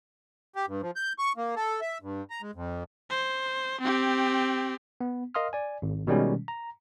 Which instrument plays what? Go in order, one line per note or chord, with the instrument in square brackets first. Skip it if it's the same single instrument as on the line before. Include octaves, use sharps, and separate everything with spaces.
[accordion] G4
G2
F3
G6
C#6
A#3
A4
E5
G2
A#5
G#3
F2
[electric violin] C5
C4 G4
[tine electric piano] B3
A#4 D#5 F5 C6 D#6 F6
D5 G#5
G#1
B2 D#3 G3 G#3 C#4
A#5